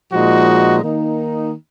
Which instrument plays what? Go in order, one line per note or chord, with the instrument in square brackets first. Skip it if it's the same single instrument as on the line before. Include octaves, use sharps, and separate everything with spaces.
[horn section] A#2 F3 G#3 D#4 F#4
D#3 A#3 D#4